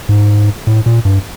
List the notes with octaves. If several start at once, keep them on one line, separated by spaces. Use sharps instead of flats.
G#2
A2
A#2
G2